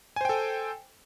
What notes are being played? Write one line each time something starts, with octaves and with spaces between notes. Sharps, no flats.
A4 C5 G5 G#5